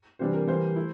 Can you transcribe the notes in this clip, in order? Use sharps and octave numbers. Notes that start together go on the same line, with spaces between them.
C3 E3 G3 D4 C5
A#4
E3 G3 A#3 C5
A3 E4